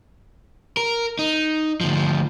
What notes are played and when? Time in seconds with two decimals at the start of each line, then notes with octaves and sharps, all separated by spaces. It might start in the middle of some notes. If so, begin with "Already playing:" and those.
0.77 A#4
1.19 D#4
1.81 D2 F3